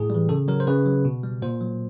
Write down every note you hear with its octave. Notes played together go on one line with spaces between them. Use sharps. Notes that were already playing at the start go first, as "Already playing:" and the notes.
Already playing: A2 G#4
E3 G3
C#3 A4
F#3 A#4
C5
C#3 B4
F#3
B2
G3
A#2 C5
F#3